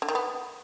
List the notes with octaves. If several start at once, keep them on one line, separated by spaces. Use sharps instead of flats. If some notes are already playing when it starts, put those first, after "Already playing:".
D3
D#3
B3